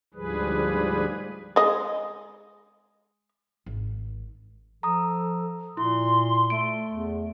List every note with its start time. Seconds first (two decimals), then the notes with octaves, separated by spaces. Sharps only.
0.14 D2 G#2 F3 G3 G#4 B4
1.56 G#3 D#5
3.66 G#1
4.83 F3 A4 A#5 D#6
5.77 A#2 E4 C6
6.50 A3 D7
6.89 E2